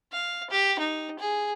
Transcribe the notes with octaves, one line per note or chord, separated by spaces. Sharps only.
F5
G4
D#4
G#4